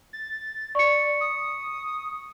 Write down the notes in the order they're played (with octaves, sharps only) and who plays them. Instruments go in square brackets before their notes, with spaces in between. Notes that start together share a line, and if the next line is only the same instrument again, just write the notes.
[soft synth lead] A6
[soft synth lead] D5 [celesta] C#6 C#7
[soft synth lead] D#6